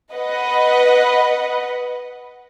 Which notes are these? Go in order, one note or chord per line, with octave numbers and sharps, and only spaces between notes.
B4 D#5 F#5